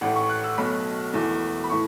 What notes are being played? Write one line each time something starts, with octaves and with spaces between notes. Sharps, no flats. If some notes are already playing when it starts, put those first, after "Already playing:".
A1 A2 A3 F#5
C#6
F#6
E6
B1 B2 F#3 A3 B5
E1 E2 E3 A3
B5
A2 E3 C#6